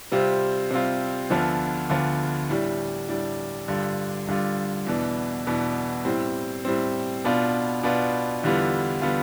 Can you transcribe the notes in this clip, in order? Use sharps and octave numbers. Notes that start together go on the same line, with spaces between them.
C3 G3 C4 F4
C3 G3 C4 F4
D2 D3 F3 B3 F4
D2 D3 F3 B3 F4
A2 G3 D4
A2 G3 D4
G2 D3 G3 D4 F4
G2 D3 G3 D4 F4
E2 B2 B3 D4
E2 B2 B3 D4
A2 G3 C4
A2 G3 C4
B2 B3 D4 F4
B2 B3 D4 F4
E2 D3 G3 B3 F4
D3 G3 B3 F4